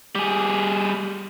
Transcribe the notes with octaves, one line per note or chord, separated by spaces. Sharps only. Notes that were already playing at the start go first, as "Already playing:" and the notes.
G3 G#4